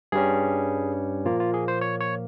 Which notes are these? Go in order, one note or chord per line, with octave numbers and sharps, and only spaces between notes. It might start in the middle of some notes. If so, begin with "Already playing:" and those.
G2 G3 C#4 G#4
A#2 F3 A#3 F4
F4
G#4
C5
C#5
C#5